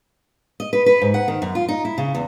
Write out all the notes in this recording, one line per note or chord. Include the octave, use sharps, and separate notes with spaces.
D#5
B4
B4
G#2
F#5
D#3
F#2
F4
D#4
E4
C#3
E2